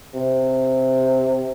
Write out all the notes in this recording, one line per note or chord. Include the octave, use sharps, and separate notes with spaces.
C3